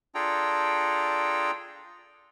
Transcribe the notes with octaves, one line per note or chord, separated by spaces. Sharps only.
D4 F4 G#4 A4 G5 A#5